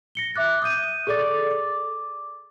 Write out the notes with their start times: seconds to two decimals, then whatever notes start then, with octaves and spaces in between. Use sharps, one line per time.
0.15 A#6 C#7 G7
0.35 E5 D6 F#6 A6
0.62 D#6 G6 D#7
1.07 G#4 A4 D5 D6 A6
1.51 D6